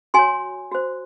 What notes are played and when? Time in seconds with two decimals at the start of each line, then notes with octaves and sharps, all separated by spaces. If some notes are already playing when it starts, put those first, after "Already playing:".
0.14 F#4 C#5 G#5 C6
0.72 F#4 C5